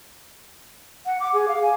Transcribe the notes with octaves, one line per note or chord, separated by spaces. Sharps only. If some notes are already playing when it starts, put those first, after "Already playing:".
F#5
D6
G#4
F5
G#5